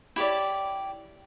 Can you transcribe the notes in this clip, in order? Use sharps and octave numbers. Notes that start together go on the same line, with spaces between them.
E4 G4 C#5 D5